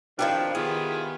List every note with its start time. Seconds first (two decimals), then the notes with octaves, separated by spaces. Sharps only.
0.19 D#3 F3 C4 D4 E4 G4
0.55 D#3 B3 E4 F4 G4 G#4